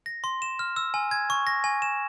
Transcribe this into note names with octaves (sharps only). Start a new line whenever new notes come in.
A#6
C6
E7
F6
E6
G#5
G#6
C#6
A#6
G#5
E7